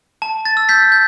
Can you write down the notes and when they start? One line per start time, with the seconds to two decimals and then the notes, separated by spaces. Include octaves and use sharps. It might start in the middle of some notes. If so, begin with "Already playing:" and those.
0.22 A5
0.45 A6
0.57 E6
0.69 G6 B6
0.92 G6